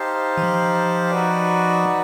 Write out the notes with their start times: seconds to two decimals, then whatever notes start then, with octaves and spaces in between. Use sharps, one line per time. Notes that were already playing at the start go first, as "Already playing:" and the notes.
Already playing: D#4 G4 C5 F5 A5
0.37 E3
0.43 F3
1.10 D#4 F#4 B4 D5